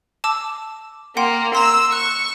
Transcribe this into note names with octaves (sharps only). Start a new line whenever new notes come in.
A5 D6 E6
A#3 F#5 G5 C6
A#5 C6 E6
C#6 F#6